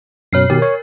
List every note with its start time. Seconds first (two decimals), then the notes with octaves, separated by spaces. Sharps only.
0.33 F#2 B2 C#5 F6 C7
0.50 B2 D#3 G4 A#4
0.62 C#5